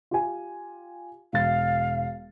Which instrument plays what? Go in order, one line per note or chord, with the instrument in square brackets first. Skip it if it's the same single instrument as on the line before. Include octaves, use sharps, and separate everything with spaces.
[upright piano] F4 G4 G#5
[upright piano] E1 A6 [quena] F5